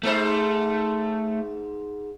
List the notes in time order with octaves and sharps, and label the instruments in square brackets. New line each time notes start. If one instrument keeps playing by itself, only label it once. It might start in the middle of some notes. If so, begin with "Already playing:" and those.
[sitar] G#2 D#4 C5 [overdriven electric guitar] A3